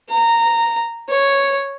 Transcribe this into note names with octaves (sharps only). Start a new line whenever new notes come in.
A#5
C#5